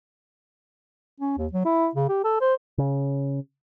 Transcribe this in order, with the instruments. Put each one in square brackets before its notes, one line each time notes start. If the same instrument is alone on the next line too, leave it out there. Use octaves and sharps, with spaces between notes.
[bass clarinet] C#4
D#2
F#3
E4
C#3
G4
A4
C5
[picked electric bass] C#3